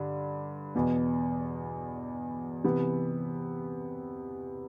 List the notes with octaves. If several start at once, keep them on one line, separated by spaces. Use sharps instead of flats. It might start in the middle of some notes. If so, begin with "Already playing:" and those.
Already playing: G2 D3 D4
E2 B2 B3
C3 E3 B3